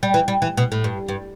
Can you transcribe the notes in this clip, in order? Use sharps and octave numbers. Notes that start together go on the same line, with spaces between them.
G3
E3
G3
E3
B2
A2
G2
G2